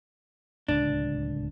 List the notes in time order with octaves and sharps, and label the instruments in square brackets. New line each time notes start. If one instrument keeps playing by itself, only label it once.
[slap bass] D1 C#2 C3 [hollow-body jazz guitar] D4